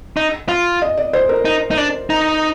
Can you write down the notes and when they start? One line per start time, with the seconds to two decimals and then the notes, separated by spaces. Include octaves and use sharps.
0.17 D#4
0.49 F4
0.82 D#5
0.97 D5
1.13 C5
1.29 A#4
1.45 D#4
1.71 D#4
1.77 D4
2.10 D#4